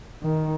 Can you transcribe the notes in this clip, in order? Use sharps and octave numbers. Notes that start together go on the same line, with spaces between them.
D#3